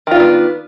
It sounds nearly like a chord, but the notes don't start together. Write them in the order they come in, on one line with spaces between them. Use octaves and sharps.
D#3 F4 D4 B3